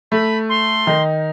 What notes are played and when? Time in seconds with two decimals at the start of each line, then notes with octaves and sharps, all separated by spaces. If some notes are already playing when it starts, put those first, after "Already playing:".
0.11 A3 B5
0.49 C6
0.87 D#3 D#4